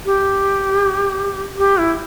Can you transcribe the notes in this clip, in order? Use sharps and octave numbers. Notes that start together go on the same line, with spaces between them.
G4
G4
E4